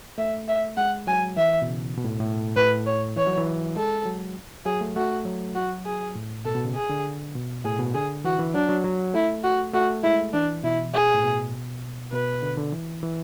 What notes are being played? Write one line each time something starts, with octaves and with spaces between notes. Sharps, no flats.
A3 E5
E5
G#3 F#5
F#3 G#5
E3 E5
B2
C#3
B2
A2
A2
A2 B4
C#5
E3 C#5
F#3
E3
G#3 A4
F#3
F#3 G#4
A3
A3 F#4
F#3
F#4
G#4
A2
B2 A4
B2
C#3
G#4
D3
B2
A2 G#4
B2
D3 G#4
E3 F#4
E3
F#3 D4
F#3
F#3
A3 E4
F#4
A3 F#4
G#3 E4
E3 D4
B2 E4
G#4
A2
B2
B2 B4
D3
D3
E3
E3